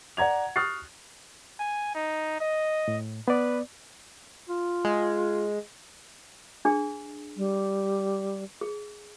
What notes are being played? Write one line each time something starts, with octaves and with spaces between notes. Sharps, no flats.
D5 F#5 A#5 G#6 F7
C#6 D#6 F6 F#6 A6 C7
G#5
D#4
D#5
A2
B3 B4 D5
F4
G#3
D4 G#4
G3
G#4